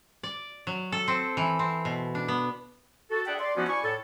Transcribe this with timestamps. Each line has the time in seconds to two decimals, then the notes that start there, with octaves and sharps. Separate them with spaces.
0.23 D5
0.67 F#3
0.92 A4
1.08 C4
1.37 E3
1.59 C4
1.85 B2
2.15 D4
2.28 B3
3.11 F#4 A4
3.27 D4 G#4 D5 E5 F#5 G5
3.39 D5 C6
3.56 F3 B3 C#4 D#4 E4 F#4
3.68 E4 D5 G#5 C#6
3.84 A2 A4